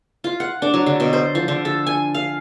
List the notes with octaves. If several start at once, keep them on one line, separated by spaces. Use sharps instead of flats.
F4
F#5
D4
F#3
D3
B2
C5
F3
D3
A4
G#5
F5